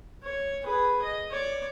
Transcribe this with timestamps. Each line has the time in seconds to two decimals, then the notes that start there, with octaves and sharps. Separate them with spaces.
0.23 C#5
0.63 G#4 B4
1.02 D#5
1.31 C#5 D5